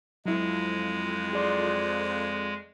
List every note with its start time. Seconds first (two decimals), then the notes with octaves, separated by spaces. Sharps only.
0.26 F2 F#3 G#3 E4
1.33 G#4 D5 C6